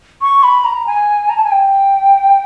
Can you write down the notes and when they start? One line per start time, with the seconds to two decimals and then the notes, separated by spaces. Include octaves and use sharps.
0.22 C#6
0.43 B5
0.65 A#5
0.87 G#5
1.29 A#5
1.36 A5
1.44 G#5
1.51 G5